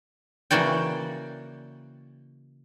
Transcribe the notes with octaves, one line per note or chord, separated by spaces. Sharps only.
C#3 E3 A#3 F#4 D5 G5